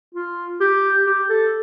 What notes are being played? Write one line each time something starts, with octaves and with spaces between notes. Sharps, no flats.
F4
G4
G4
A4